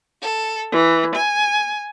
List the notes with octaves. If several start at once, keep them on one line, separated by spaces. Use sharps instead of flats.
A4
E3
G#5